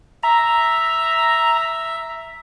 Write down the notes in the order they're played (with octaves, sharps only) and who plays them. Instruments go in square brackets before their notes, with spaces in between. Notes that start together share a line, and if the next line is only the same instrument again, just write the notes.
[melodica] E5 [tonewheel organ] A#5